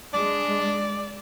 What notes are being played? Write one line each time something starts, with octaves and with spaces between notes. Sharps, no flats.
G#3 D4 D5